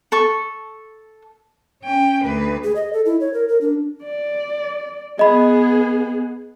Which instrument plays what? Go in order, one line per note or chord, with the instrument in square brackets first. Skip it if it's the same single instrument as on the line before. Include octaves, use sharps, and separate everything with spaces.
[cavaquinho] A4 C#6
[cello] C#4 G5
D2 B4
[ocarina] G#4
D#5
A4
E4
C#5
A#4
A#4
D4
[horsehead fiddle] D5
[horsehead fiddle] B3 G#4 [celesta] D#5 B5